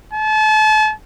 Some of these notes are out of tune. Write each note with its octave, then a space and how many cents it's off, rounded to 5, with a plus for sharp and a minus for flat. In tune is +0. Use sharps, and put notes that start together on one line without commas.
A5 -35